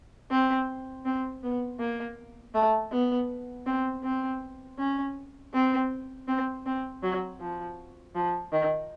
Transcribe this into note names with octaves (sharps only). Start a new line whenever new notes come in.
C4
C4
B3
A#3
A3
B3
C4
C4
C#4
C4
C4
C4
F#3
F3
F3
D#3